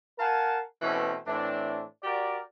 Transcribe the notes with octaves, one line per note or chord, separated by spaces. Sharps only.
A#4 F5 F#5 G#5 A5
B2 E3 A3 C4 C#4
A2 E3 C4 D4
F#4 G4 A#4 D5